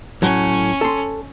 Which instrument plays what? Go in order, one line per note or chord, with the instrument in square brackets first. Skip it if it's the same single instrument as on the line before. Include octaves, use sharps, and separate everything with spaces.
[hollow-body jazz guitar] A2 F#3 [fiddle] C#4
[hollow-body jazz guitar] A4 C6